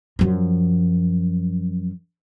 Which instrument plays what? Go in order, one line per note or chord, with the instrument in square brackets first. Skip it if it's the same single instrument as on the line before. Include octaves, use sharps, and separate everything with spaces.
[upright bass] F#2 F3